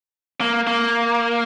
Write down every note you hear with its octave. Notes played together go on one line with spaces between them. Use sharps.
A#3
A#3